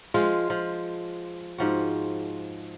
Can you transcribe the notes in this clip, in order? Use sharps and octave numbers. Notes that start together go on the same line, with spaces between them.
F3 G#3 F4
F3
G#2 F3 F#4